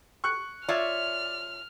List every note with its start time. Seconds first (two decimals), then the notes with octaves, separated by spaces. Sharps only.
0.24 C#6 F#6 C#7
0.69 F4 C#5 D5 E5 F6